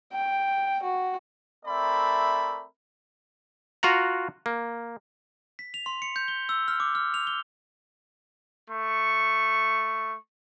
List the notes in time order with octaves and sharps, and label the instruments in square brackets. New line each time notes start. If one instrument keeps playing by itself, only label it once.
[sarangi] G5
F#4
[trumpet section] A3 C4 A#4 D5 E5 B5
[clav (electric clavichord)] F4 F#4 F#5 A#5
A#3
[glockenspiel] B6
F7
C6
C#7
G6
G7
E6
F6
D6
F6
F7
G7
[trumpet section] A3 C#6